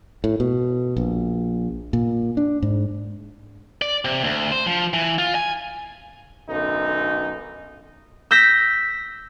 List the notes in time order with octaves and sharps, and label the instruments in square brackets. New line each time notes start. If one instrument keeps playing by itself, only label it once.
[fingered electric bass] A2
B2
A#1
A#2
D4
G#2
[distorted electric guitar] D5
C3
D2
C5
F3
E3
F4
G#5
[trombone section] B1 F#2 D3 D#4
[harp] E6 G6 A#6 B6